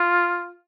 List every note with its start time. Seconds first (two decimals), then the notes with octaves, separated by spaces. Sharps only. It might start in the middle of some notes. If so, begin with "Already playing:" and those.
Already playing: F4